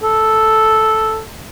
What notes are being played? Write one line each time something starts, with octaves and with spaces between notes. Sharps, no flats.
A4